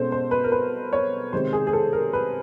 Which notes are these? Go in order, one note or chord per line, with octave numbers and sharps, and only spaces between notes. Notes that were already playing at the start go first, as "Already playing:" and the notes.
Already playing: B2 G#3 C#4 A4 C5
C5
B4
A#4
B4
C#5
C3 D#3 G#3 C5
G#4
G#4
A4
A#4
B4